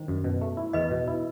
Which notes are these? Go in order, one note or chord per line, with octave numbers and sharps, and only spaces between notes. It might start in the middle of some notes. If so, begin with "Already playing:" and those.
Already playing: D#3 C5
F#2
B2
A3
E4
E2 B4 D#5
B2
E4